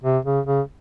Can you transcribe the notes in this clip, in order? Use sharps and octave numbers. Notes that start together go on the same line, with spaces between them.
C3
C#3
C#3